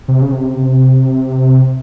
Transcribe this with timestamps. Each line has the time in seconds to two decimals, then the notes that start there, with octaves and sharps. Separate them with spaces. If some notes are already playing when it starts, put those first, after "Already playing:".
0.08 C3
0.22 C#3
0.32 C3